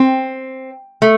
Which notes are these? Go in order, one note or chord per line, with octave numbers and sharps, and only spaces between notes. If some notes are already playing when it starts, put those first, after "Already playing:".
Already playing: C4
A3